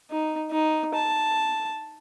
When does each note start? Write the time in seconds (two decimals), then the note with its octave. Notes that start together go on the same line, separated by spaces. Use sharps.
0.10 D#4
0.51 D#4
0.95 A5